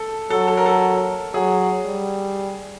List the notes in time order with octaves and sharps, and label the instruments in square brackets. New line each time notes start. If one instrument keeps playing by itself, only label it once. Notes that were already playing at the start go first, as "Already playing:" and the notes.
Already playing: [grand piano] A4
[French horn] F#3 [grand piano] A4
[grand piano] A4
A#4
A4
[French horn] F#3 [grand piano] G#4
[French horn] G3